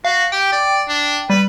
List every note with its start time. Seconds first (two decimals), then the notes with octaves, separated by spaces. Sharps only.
0.05 F#4 F5
0.32 G4 G5
0.52 D5
0.88 D4
1.30 G3 B4